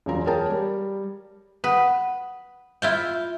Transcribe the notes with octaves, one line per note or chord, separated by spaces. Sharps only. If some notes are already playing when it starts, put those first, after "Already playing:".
E1 F#2 F4 A#5
G#4 A#4 C#5 G5 A5 A#5
G3
B4 F#5 D#6
E4 F4 G5